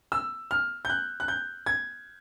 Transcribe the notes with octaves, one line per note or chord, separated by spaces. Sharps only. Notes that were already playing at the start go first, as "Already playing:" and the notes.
E6
F6
G6
F#6
F#6
G6
G#6